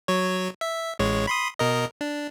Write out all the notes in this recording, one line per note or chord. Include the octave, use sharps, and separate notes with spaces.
F#3 C#5
E5
A1 G#3 C#5
B5 C6 D#6
B2 A#4 D#5
D4